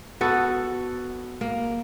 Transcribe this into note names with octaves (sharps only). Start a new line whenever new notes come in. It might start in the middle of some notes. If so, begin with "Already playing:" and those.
B3 F#4 A4
A#3